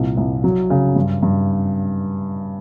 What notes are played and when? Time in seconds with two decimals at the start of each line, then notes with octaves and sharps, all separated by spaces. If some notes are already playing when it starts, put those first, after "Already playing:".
Already playing: C2 A#2
0.17 C2
0.44 F#3
0.70 C#3
0.96 G2
1.23 G2